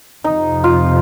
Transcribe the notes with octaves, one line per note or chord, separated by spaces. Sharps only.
F2 C3 F3 D#4
F4